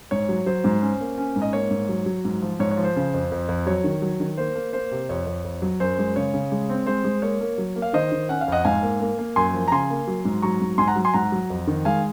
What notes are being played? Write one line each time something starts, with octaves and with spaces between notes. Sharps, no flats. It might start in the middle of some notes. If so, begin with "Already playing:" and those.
G#2 C#5
F#3
F#3 C5
G#2
C#4
A#3
C#4
G#2
D#5
A#3 C#5
G#2
F#3
F#3
G#2
F3
G#2 C#5
C#5
F3
C5
C#3
F2
F2
F2
F#3 C#5
D#3
F#3
D#3
A#3 C5
A#3
A#3 C5
C3
F2 C#5
F2
F2
F#3
F#2 C5
G#3
C#3 C#5
C#3
G#3
C4
G#3 C5
G#3
A#3 C#5
A#3
F#3
A#3
F5
D#3 C5 D#5
D#3
C#4 F#5
F5
F2 D#5 F#5
G#2 F5 G#5
A#3
A#3
A#3
F#2 G#5 C6
F3
A#5
C#3 G#5 C6
A#3
F#3
G#2
F#3 A#5 C#6
G#2
G#2 G#5 C6
F#5 A#5
F#3
G#5 C6
G#2 F#5 A#5
F#3
F2
D#3
G#3 F5 G#5